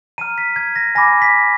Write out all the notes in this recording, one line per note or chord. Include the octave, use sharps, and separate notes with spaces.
A#5 F6 D#7
B6
G#6
A#6
G#5 B5 D6 A#6
B6